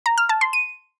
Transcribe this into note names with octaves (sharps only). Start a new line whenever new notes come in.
A#5
F6
A5
C6
D#7